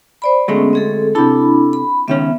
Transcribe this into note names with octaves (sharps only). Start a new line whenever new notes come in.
C5 D5 B5
D2 G#3 A3 B3 C#4
C4 G#4 A4
C3 D4 E4 A4 B5
B5
C#2 D#3 B3 C#4 E5